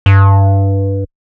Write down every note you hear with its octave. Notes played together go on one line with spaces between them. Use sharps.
G2